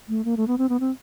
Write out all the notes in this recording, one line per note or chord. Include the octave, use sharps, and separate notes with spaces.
A3
A#3
A3
B3
C4
B3
C4